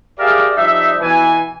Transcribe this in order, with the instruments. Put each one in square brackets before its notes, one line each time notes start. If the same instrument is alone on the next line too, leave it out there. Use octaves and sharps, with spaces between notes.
[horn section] G4 G#4 A#4 D5 E5 F5
F3 G3 D#4 E5
B2 E3 G#5